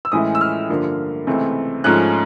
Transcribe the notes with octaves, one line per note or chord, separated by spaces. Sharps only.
E6
A2 E3 G#3 C#4 E4 D#6
E6
F6
G2 D3 F3 A#3
C#2 C3 E3 A3 C4
G#2 F3 A3 C#4 F#6